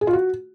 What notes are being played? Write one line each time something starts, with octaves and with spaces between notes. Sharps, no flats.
G#4
F4
F#4